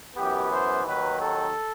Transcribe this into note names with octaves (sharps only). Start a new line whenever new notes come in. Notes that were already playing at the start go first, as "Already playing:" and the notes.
F#2 E3 B3 G4
C5
D#2 D#3 F#3 B4
A4